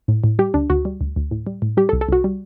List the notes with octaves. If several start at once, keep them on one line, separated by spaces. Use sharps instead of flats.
A2
A2
G3 G4
D2 D4
D2 F#4
G3
D2
D2
A2
G3
A2
G3 G4
A4
C2
A4
C2 F#4
G3